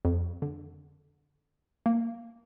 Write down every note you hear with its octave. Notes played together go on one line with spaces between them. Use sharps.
F2
D3
A#3